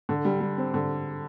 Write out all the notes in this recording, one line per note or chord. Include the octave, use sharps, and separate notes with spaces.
D3
G3
G3
C4
D3